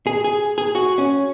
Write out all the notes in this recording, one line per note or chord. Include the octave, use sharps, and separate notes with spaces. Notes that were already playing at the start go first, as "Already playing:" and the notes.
G#4
G#4
G#4
F#4
C#4